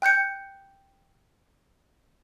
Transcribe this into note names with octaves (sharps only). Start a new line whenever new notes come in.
G5 F#6 G6 C#7